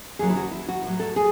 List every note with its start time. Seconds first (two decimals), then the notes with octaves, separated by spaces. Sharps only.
0.19 D#2 C#3 F#3 G#4
0.30 E4
0.36 F#4
0.51 E4
0.69 F#4
0.84 A2 F#3
1.00 A4
1.16 G#4